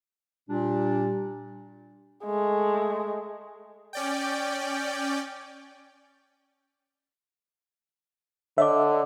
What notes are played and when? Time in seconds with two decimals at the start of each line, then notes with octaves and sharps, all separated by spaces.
0.49 A#2 G3 D4
2.24 G#3 A3
3.93 C#4 D5 G5
8.58 D3 C#5 D#5 E5 D6